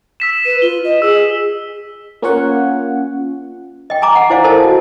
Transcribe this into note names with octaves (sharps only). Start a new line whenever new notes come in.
E6 B6 E7
B4 D#7
F4 G7
D#5
G#4 E6
A#3 C#4 F4 C#5 F#5
D#5 G5
G#5 A#5 D6
F#5
E4 C5 D5 F5 G#5
A4 A#4 C5 D#5 A5
F#4